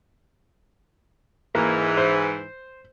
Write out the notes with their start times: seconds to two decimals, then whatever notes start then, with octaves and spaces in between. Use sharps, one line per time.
1.55 G#2 E3 A#3
1.97 C5